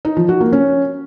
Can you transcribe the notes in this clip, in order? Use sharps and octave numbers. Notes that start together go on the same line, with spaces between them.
D#4
F3
F#4
A#3
C#4